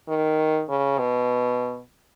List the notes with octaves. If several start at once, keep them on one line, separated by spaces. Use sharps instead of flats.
D#3
C#3
B2